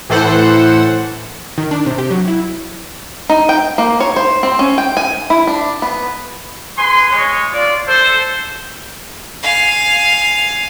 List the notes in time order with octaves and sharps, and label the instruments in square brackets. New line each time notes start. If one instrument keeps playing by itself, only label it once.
[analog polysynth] A2 E3 A4 C5 F#5
[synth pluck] D#3
D4
C3
G4
F#3
E4
[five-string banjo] D#4
G5
A#3
C#5
C5
C4
C#4
G5
G#5
E4
D4
B3
[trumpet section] G#4 B4 G#5 C6
G#3 C#5
F4 D5
A4 C5
[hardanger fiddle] F5 G#5